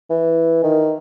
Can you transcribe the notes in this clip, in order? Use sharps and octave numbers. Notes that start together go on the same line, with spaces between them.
E3
D#3